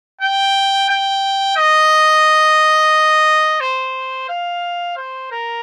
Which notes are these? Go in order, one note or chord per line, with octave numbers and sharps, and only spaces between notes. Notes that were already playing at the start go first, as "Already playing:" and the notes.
G5
G5
D#5
C5
F5
C5
A#4